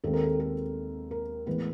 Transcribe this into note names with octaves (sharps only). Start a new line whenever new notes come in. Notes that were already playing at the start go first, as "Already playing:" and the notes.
D#2 D#3 G#3 C4 A4
A#4
A4
A4
A#4
A2 E3 G#3 B3 B4